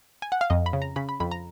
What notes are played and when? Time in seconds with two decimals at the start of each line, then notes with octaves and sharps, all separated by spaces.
0.22 G#5
0.32 F#5
0.41 F5
0.50 F2 D#5
0.66 B5
0.73 C#3
0.82 A#5
0.96 C#3 B5
1.09 B5
1.20 F2 B5
1.31 A#5